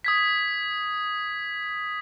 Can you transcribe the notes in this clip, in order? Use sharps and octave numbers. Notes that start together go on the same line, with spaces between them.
D#6 G#6 B6